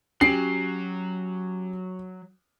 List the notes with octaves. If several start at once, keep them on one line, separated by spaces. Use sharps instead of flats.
F#3 C#4 G4 C7 D7